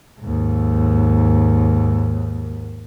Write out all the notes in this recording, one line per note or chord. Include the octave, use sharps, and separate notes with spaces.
D#2 G#2